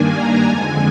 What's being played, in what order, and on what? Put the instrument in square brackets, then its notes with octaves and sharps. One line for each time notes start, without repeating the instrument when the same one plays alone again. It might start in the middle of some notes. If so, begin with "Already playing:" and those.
Already playing: [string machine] G2 D#3 A#3 D4 G#5
A#5
F2 D3 G#3 G#5